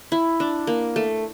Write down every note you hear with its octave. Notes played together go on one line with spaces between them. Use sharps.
E4
D4
A#3
A3